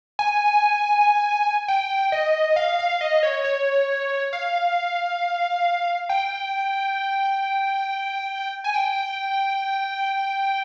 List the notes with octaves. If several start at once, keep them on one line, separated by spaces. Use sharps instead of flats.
G#5
G5
D#5
F5
F5
D#5
C#5
C#5
F5
G5
G#5
G5